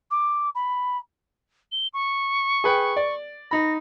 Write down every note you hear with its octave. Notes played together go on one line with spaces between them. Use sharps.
D6
B5
G7
C#6
G#4 B4 G5
D5
D#4 B5 A#6